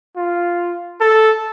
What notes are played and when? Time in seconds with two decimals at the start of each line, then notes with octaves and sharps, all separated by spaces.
0.17 F4
1.00 A4